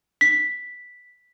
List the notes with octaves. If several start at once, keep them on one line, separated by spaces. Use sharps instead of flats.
B6